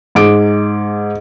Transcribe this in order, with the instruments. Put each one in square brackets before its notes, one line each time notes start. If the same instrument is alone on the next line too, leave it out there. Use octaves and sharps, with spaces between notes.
[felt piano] G#2 G#4 D6 D7